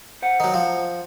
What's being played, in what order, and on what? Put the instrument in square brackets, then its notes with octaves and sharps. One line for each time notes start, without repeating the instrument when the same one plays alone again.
[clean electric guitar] C5 F#5
[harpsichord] D#3 F#3
F3